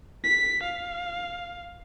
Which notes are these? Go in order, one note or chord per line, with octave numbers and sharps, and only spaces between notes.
B6
F5